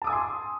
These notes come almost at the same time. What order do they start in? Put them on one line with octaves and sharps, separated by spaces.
A5 D6 D#6 G#5 C6